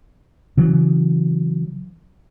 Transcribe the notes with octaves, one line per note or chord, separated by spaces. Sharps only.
C#3 E3 F#3